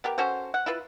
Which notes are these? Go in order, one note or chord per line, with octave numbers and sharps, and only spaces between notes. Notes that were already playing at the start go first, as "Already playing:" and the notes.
B3 G4 A#4
C#4 F#4 A4 C5
F#5
E4 F4 B4